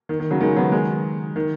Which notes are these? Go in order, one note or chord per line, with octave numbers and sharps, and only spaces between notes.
D#3
D#3
C#3 F#3
D#3 G#3
F#3 B3
D#3 G#3
D#3